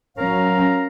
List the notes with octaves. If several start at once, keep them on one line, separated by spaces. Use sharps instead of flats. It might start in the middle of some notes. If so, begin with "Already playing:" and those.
F#3 C#4 A#4 F5 A#5